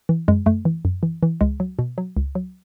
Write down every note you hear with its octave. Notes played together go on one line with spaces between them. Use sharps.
E3
F#2 G#3
F#2 A3
E3
F#2
E3
E3
C#2 G#3
F#3
B2
F#3
C#2
F#3